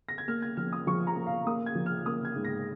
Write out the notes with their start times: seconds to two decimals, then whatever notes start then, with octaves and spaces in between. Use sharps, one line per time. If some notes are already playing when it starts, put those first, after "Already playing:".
0.09 A#6
0.18 G#6
0.28 A#3 F6
0.42 G#6
0.57 F3 F6
0.73 D#6
0.87 F3 C#6
1.07 A#5
1.16 A#3
1.27 F5
1.46 A#3 D#6
1.66 G#6
1.75 F3
1.86 F6
2.06 A#3 D#6
2.25 G#6
2.36 G#2
2.45 A#6